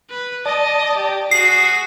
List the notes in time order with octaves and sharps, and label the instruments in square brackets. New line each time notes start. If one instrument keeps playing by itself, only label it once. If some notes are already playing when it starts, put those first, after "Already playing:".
[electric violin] B4
[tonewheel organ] D5 A5 [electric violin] D#5
[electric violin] G4
[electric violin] F#4 G#4 [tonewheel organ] D#6 [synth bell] C7